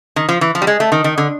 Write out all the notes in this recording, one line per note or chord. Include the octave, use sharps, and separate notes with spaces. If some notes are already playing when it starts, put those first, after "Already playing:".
D#3
F3
E3
F3
G3
G#3
A3
D#3
D#3
D3